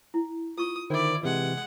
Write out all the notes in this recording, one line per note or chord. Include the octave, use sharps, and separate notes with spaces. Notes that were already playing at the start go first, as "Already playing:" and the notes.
E4
F4 C#6 D#6
D3 D#3 E4 C5 D5
C3 E3 G#3 F#5